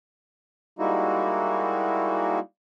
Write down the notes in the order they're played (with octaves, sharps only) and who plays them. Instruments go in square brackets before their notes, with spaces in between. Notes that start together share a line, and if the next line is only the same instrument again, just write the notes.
[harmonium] G3 G#3 A#3 D#4 E4 F#4